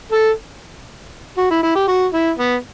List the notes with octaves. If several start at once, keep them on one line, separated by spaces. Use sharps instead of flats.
A4
F#4
E4
E4
G4
F#4
E4
B3